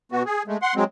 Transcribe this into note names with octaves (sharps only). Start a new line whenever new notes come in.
B2 B3 F#4
G#4
G#3 A3
F#5 C6
F#3 G#3 C4